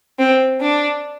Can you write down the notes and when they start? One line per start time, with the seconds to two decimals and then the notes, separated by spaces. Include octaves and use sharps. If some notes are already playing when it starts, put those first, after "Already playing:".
0.19 C4
0.61 D4